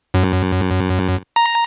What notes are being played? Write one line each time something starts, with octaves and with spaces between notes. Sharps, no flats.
F#2
A#5